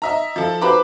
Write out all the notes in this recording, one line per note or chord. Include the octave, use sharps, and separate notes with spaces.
D#5 E5 A#5
F3 A4
G4 B4 C5 A#5 B5 D6